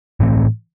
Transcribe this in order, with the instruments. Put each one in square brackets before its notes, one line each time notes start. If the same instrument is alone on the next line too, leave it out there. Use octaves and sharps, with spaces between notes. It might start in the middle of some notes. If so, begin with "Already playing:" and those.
[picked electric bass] A2 E3 A3 C4